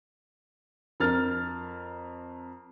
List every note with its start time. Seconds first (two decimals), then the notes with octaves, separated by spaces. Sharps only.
1.00 F2 A#4 F6 A6